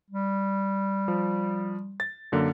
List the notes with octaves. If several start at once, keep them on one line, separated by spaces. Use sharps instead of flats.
G3
F3
A6
F#2 D3 A#3